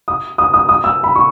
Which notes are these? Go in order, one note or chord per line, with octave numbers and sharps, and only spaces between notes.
D#6
D#6
D#6
D#6
E6
B5
C#6